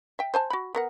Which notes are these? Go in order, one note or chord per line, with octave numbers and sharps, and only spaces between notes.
E5 G5
C5 G#5 A5
F#4 B5
B3 A#4 F#5